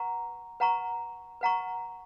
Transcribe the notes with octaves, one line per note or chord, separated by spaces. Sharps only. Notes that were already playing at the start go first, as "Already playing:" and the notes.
Already playing: B4 F#5 A#5 C#6
B4 F#5 A#5 C#6
B4 F#5 A#5 C#6